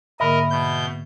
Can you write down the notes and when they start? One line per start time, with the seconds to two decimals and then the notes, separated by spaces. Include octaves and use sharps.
0.20 G#2 D3 A#3 A#4 D#5 E5 B5
0.50 B2 G6